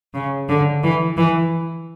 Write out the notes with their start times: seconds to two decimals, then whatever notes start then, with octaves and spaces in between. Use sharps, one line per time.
0.14 C#3
0.49 D3
0.82 E3
1.17 E3